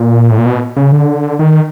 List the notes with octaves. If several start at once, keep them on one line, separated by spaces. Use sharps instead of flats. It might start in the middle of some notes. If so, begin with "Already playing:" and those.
Already playing: A#2
A2
A#2
B2
C#3
D3
D#3